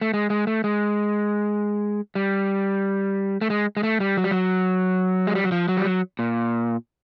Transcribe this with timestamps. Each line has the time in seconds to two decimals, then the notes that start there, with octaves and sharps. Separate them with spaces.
0.01 A3
0.14 G#3
0.30 G#3
0.47 A3
0.64 G#3
2.15 G3
3.41 A3
3.50 G#3
3.77 G#3
3.83 A3
4.00 G3
4.17 F#3
4.24 G3
4.31 F#3
5.27 G#3
5.35 G3
5.44 F#3
5.52 F3
5.68 F#3
5.77 G3
5.85 F#3
6.19 A#2